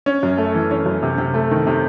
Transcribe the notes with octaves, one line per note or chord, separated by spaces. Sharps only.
C#4
F#2
A3
E3
C#4
F#2
C3
C3
A3
D#3
C3